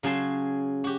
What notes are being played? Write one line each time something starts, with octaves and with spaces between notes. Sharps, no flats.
C#3 F#3 G#4 A5 C6
F#4 G4